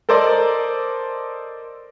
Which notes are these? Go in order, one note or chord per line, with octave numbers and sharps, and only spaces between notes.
A4 A#4 C5 D5 D#5